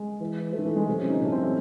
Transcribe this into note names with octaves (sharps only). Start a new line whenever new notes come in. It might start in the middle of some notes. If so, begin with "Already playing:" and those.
Already playing: G#3
E3
D#3 A3
E3
G#3
C3 F#3
C#4
D#4
A2 A3
C4
E3